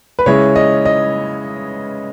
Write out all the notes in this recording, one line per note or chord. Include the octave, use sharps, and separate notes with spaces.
B4
C#3 G#3 C#4 E4 C#5
D#5
D#5